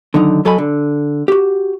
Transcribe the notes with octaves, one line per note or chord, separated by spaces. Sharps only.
D3 D#3 F#3 D#4
F#2 F#3 A4 D#5 G#5 B5
D3
F#4 G4